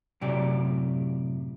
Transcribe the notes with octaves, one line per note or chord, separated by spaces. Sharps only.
F#2 A2 C3 G4 D5